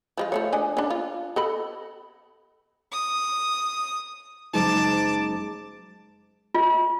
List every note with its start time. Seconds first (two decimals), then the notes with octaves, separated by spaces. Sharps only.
0.17 F3 G#3 F4
0.32 F3 A3 C#5
0.53 D4 D#5 G#5
0.77 C#4 D4
0.90 F4
1.36 A4 D#5 B5
2.92 D#6
4.53 F#1 G#3 D#4 A5 D6
6.55 F4